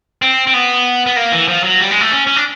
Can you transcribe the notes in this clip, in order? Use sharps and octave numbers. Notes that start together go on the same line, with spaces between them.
C4
C4
B3
B3
A#3
E3
F3
F#3
G3
G#3
A3
C#4
C#4
D4